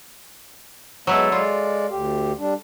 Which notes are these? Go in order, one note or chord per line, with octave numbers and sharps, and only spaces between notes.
F#3 G#3 B3 E4 A4
G#3 F4 D5
D2 G4
G3 D4